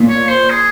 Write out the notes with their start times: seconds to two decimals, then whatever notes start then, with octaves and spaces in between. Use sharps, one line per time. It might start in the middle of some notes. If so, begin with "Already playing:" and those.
Already playing: A#2
0.09 C#5
0.29 C5
0.50 G#4